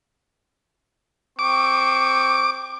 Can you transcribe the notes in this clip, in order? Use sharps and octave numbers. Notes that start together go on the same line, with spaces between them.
C4 C#6 D6